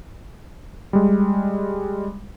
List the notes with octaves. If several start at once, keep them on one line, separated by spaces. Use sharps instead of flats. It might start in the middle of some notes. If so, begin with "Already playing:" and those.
G3 G#3